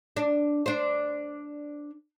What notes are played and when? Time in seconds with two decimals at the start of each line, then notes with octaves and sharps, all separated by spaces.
0.17 D4
0.66 D4 C5